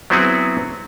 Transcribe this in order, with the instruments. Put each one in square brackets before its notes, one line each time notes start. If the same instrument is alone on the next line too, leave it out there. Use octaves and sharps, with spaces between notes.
[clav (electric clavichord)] F#3 B3 C4 E4 F#4 G#4